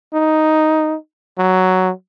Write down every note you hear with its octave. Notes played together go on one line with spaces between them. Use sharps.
D#4
F#3